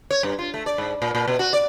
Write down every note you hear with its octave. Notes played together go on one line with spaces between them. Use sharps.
C#5
G2
F4
A3
D5
G#2
A#2
A#2
B2
F#4
D5